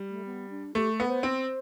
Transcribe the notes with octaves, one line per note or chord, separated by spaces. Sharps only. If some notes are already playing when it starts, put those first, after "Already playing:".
Already playing: G3
A3
B3
D4
A3 G4
A4
B3
C5
C4 C5